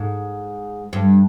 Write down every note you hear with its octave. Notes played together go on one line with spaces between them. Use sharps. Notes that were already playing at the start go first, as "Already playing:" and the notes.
Already playing: G#2
G2